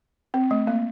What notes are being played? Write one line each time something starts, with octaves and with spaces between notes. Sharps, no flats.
C4
A3
A#3